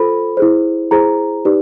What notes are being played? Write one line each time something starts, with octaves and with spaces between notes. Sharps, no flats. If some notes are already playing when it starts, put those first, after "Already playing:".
Already playing: F4 A4 C5 B5
E4 G#4 C5
E4 G#4 C5 A#5
D#4 G4 B4 D5